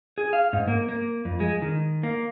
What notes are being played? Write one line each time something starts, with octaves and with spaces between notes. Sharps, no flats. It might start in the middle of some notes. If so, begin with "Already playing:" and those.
G#4
F5
G#2
A#3
A#3
F2
G#3
D#3
A#3